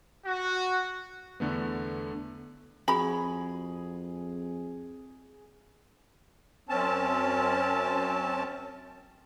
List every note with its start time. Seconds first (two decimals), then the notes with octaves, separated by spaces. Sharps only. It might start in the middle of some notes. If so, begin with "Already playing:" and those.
0.25 F#4
1.40 E2 D3 A3 B3
2.88 F2 F#4 G#4 B5
6.69 F#2 C4 C#4 A5